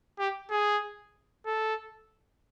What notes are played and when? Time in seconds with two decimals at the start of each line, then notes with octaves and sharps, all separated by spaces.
0.19 G4
0.50 G#4
1.46 A4